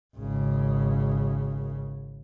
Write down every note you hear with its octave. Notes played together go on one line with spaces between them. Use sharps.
G#1 C#3